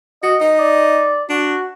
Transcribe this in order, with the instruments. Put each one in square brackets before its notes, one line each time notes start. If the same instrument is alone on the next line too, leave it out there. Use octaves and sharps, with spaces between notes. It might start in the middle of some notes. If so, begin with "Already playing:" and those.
[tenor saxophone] F#4 [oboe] D#5
[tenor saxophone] D#4 [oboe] D#5
[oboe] D5
[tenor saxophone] D4 [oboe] F#4